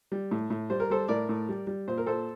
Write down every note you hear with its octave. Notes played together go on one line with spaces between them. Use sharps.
G3
A2
A2
G3 C5
A#4
G3 A4 C5
A2 A#4 D5
A2
G3
G3
A#2 C5
A#4
A#2 A4 C5